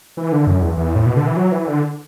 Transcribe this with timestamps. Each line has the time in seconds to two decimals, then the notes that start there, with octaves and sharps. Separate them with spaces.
0.17 E3
0.32 D3
0.47 F#2
0.62 E2
0.77 E2
0.96 A2
1.06 B2
1.17 D3
1.27 E3
1.37 F#3
1.52 E3
1.67 D3